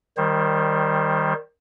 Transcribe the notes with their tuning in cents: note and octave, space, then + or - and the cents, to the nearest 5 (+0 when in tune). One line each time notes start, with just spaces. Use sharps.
D#3 +0 G3 +0 C5 +30